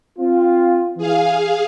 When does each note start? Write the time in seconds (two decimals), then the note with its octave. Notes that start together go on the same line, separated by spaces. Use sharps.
0.18 C4 F4
0.98 E3 G#4 F5